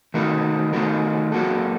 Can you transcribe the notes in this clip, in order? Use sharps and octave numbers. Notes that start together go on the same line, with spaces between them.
D#3 A3 D#4 F#4 A#4
D#3 A3 D#4 F#4 A#4
F#3 A#3 F#4 A4